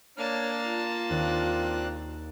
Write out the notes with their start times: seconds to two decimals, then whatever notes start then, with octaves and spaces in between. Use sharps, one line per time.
0.17 A#3 D4 C#5 A5 F6
0.63 F4
1.10 D#2 C4 D4 C#6 F#6 G6